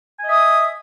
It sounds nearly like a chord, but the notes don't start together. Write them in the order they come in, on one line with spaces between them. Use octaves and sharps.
G#5 D#5 E5 D#6